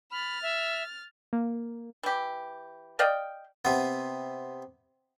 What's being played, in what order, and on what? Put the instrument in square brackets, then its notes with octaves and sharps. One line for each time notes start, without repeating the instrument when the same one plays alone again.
[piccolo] B5 [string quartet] F6 A6
[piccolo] E5
[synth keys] A#3
[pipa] E3 G4
D5 D#5 F5 G5
[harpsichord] C3 B3